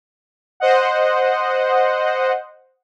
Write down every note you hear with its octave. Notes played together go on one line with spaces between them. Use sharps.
C5 D#5 F#5